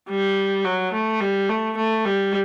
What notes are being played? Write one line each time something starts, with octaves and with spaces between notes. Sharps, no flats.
G3
F#3
A3
G3
A3
A3
G3